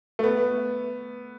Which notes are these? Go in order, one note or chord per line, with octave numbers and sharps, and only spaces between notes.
A3
B3